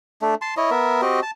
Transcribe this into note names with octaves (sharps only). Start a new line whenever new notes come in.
A3 D4
A5 C6
E4 C#5 D#5
B3 A#4 E5
C4 F#4 G4 D#5
A5